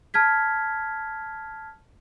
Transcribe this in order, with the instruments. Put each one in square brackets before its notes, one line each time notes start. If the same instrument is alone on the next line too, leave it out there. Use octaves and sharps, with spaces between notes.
[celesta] A5 F6 G#6 B6